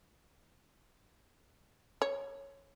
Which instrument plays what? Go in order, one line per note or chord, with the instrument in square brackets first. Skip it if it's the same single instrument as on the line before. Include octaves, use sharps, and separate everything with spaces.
[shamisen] C#5